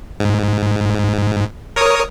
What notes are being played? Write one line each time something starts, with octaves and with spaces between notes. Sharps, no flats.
G#2
A#4 C#5 D#6